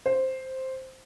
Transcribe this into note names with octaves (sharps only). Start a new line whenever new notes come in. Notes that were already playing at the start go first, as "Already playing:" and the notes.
C5